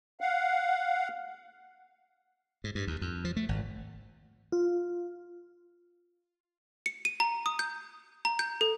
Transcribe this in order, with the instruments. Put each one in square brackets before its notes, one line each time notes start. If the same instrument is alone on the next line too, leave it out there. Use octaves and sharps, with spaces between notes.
[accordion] F5 F#5
[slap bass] G#2
G2
D#2
F2
F3
A3
G#1
[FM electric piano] F4
[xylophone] C#7
D#7
A#5
D#6
G6
A#5
G6
A4